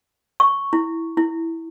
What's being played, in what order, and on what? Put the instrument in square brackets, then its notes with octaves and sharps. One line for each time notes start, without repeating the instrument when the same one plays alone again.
[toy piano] C#6
E4
E4